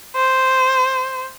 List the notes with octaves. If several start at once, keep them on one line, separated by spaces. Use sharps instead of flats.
C5